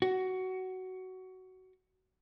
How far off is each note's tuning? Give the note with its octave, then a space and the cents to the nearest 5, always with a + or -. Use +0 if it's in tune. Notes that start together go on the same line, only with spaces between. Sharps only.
F#4 +15